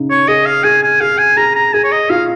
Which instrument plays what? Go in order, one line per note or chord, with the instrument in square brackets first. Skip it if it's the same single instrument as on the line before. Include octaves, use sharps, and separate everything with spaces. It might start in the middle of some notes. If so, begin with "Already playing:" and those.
Already playing: [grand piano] C#3 D#4
[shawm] C#5
[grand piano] G#4 [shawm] D#5
[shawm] F5
[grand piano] G#4 [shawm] G#5
[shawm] G#5
[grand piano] G#4 [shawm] F5
[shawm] G#5
[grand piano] G#4 [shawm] A#5
[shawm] A#5
[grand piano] G#4 [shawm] G#5
[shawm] C#5
D#5
[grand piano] F4 [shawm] F5